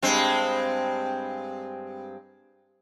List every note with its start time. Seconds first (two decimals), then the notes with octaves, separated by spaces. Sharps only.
0.02 G2 G#3 C4